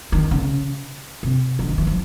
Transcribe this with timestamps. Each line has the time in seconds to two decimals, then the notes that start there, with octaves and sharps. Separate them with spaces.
0.12 D#3
0.31 C#3
1.23 C3
1.59 D3
1.69 D#3
1.78 E3
1.87 F3